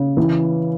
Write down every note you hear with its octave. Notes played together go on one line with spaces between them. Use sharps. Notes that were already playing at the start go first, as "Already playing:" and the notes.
Already playing: C#3
E3